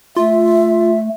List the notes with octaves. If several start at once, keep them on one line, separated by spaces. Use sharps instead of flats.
A3 F4 E5